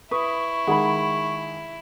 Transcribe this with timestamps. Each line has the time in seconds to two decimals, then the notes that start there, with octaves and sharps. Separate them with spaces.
0.11 E4 B4 C#6 D#6
0.67 D#3 G#3 G#4 F#5 B5